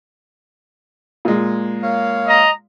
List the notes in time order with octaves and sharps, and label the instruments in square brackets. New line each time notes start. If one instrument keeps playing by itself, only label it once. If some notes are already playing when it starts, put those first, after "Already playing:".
[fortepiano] A#2 G#3
[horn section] A#3 C#5 F5
[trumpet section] D#5 A#5